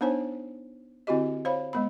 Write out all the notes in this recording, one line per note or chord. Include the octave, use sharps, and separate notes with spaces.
B3 D4 D#4 C5 C#5 G#5
D3 C4 E4 F#4 G4 D#5
C5 C#5 F5 B5
G#3 B3 B5